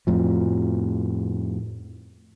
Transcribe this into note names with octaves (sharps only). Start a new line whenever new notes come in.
F2 A2 F3